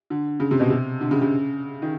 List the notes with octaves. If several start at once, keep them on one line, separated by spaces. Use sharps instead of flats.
D3
C#3
C3
B2
C3
D3
C#3
C#3
D#3